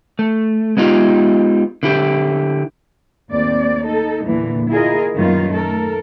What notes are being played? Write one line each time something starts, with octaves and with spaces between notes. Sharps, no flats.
A3
G#3 B3 D#4 F4 G4
D3 E4 G4
D#2 A3 C4 D5
D#4 A4
E2 A#2 D3 E3
E4 F4 G#4 A#4 D#5
F#2 A#2 D#3 G3 B3 F4
A3 A4 A#4